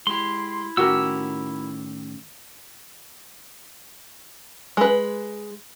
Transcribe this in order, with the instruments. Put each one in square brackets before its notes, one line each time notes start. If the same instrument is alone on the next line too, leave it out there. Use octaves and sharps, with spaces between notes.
[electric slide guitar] G#3 G4 [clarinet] E4 [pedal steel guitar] C6
[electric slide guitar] A2 D#3 C#4 [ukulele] F#4 G4 A#4 [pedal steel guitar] E6
[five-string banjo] G#3 B4